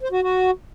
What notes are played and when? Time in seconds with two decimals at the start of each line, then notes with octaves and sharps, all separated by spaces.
0.01 C5
0.12 F#4
0.23 F#4